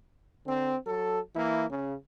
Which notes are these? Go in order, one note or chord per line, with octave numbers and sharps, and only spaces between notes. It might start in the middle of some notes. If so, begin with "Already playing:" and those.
D3 C4
F#3 A4
E3 A#3 E4
C#3